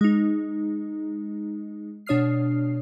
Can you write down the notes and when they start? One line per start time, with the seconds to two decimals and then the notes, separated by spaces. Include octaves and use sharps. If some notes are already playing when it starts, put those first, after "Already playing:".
0.01 G#3 D#4
2.06 B2 D4 C#5 D#6 F6 C7